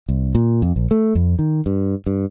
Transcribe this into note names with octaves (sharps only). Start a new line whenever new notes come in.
C2
A#2
F2
A#1
A3
F2
D#3
G2
G2